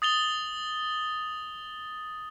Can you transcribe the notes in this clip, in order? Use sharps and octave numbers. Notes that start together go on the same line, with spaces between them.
D#6 A6 F7 G7